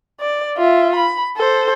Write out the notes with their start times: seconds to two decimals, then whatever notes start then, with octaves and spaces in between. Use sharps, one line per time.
0.21 D5
0.57 F4 E5
0.96 B5
1.37 A4 C5